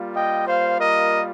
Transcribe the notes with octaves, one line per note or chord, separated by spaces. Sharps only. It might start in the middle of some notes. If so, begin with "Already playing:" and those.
Already playing: G3 A#3 F4
D#5 G5
C5 F5
A#4 D#5